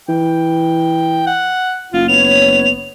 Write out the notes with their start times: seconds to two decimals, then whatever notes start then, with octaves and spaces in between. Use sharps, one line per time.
0.09 E3 G5
1.27 F#5
1.93 F#1 F4
2.08 B3 C#5 F7